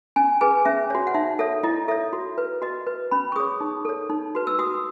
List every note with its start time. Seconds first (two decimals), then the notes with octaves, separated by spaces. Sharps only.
0.16 C#4 G#5
0.41 G#4 B4 G#5
0.65 C#4 E5
0.90 F#4 C#5
1.07 F#5
1.14 D#4 E5
1.39 A4 C#5 E5
1.63 E4 D#5
1.88 A4 C#5 E5
2.13 F#4
2.38 B4
2.62 F#4 D#5
2.87 B4
3.11 C#4 B5
3.32 C#6
3.36 G#4 C#5 D#6
3.61 D#4
3.85 A4 C#5
4.10 D#4
4.35 F#4 B4
4.47 E6
4.59 F#4 D#6